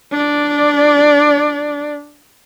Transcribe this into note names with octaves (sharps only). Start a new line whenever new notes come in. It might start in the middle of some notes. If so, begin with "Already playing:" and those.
D4 D5